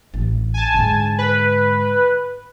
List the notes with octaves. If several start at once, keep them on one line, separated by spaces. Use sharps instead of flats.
A1
G#5 A5
G#2 D3
B4